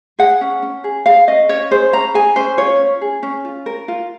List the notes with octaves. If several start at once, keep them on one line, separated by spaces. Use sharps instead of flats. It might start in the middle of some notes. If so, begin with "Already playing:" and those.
G#4 F#5
C#4
C#4
G#4
G#4 F5
C#4 D#5
C#4 C#5
G#4 C5
C#4 A#5
G#4 G#5
C#4 C5
F4 C#5
C#4
G#4
C#4
F4
A#4
F4